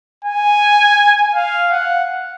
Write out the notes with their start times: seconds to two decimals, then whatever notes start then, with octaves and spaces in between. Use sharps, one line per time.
0.24 G#5
1.35 F5
1.71 F#5